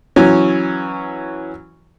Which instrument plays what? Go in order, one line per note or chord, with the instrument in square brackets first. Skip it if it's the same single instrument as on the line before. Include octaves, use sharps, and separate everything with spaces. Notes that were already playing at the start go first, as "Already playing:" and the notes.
[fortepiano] E3 F#3 C#4